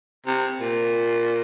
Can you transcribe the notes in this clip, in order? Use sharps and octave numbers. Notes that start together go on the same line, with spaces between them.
C3
A#2